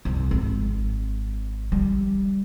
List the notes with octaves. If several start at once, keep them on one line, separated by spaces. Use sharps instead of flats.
C2
G#1
G3